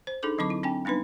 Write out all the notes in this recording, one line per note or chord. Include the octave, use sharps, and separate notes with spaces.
C5
D4 D#4 G#4 A4 D6
D3 F#3 C4 B5 D6
E4
C4 D4 G5 G#5
G3 B3 D4 D#4 B4